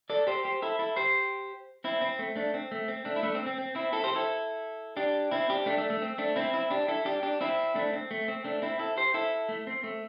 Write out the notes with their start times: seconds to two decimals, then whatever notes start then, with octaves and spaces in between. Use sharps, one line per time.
0.10 A4 D5
0.27 G4 C5
0.45 G4 C5
0.62 E4 A4
0.79 E4 A4
0.96 G4 C5
1.84 C4 E4
2.01 C4
2.19 A3
2.35 A3 D4
2.54 C4
2.71 A3
2.88 C4
3.05 A3 D4
3.16 E4
3.23 A3 D4
3.35 C4
3.46 C4
3.58 C4
3.75 C4 E4
3.93 E4 A4
4.04 G4 C5
4.15 E4 A4
4.97 D4 G4
5.31 C4 E4
5.49 D4 G4
5.66 A3 D4
5.78 A3 D4
5.90 A3
6.02 C4
6.18 A3 D4
6.36 C4 E4
6.53 C4 E4
6.70 D4 G4
6.88 E4 A4
7.05 D4 G4
7.23 D4 G4
7.41 C4 E4
7.75 A3 D4
7.93 C4
8.11 A3
8.28 C4
8.44 A3 D4
8.62 C4 E4
8.79 E4 A4
8.97 G4 C5
9.14 E4 A4
9.49 A3
9.67 C4
9.84 A3